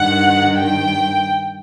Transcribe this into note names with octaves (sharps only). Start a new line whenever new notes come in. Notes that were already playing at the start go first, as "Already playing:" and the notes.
Already playing: G2 D#3 F#5
G5